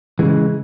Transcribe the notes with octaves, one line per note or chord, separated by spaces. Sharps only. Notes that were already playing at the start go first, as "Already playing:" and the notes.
C#3 E3 G#3